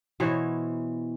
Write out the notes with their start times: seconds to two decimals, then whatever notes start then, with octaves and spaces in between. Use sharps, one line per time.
0.20 B2 E3 C5 C#5